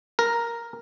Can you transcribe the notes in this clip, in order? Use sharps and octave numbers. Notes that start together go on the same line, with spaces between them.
A#4